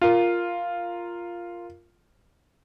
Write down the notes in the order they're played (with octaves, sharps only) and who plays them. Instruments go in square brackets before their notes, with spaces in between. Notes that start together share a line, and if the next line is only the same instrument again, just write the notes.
[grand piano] F4 A#4